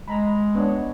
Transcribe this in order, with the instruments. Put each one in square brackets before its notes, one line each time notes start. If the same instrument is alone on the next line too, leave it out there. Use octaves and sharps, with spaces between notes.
[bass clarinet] G#3 [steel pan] A#5 B5
[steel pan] B3 D4 C#5